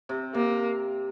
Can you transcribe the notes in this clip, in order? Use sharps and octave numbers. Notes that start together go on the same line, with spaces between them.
C3
C3 A#3